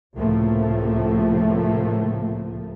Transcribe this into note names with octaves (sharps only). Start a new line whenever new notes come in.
C#2 A2 C3 F3 A3 A#3